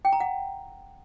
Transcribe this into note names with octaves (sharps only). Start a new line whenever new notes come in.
G5
A#5
F#5